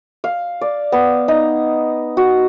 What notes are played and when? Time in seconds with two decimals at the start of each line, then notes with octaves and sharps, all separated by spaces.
0.24 F5
0.61 D5
0.92 B3
1.28 D#4
2.17 F#4